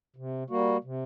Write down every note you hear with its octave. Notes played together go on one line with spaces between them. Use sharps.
C3
G3 A#3 F#4
C3